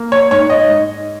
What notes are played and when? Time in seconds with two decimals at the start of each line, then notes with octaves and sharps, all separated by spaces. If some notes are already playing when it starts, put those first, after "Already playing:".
Already playing: A#3
0.12 C#5
0.31 G#2 C#5
0.50 D#5
0.68 G#2